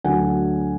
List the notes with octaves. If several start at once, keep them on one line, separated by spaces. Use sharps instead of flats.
D2 D3 F#3 A3 D4 F#5 G#5